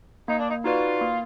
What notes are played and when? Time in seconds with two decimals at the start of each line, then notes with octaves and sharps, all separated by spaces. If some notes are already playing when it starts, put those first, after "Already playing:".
0.28 A#3 D#4
0.38 D4
0.49 D#4
0.64 D#4 F4 F#4 B4 D5
1.01 A#3